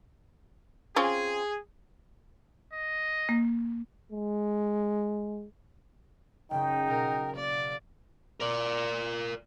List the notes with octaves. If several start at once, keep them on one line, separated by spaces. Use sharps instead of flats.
C4 C#4 F4 G#4
D#5
A#3
G#3
F#1 C#3 D#4 G5
B2 A#4
A#3 D5
A#4 D5